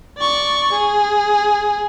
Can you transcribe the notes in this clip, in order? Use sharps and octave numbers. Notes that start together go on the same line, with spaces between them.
D5 C#6
G#4